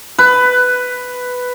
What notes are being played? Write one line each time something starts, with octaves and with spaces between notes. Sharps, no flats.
B4